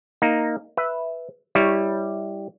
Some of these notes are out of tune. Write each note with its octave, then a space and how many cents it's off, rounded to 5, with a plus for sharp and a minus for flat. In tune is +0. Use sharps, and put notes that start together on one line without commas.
A#3 -5 D#4 +0
B4 +0 E5 -5
G3 +0 E4 -15 C#5 +0